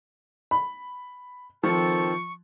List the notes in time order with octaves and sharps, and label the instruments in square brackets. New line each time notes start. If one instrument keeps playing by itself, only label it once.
[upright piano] B5
[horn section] D#3 C4 A4 [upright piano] F3 [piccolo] C#6